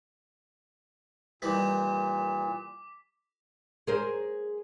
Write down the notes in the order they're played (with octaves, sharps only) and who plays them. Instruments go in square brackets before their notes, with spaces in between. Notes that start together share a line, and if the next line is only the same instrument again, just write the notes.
[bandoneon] A#2 [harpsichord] D#3 E3 G3 [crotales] D6 B6
[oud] G#4 A#4 C5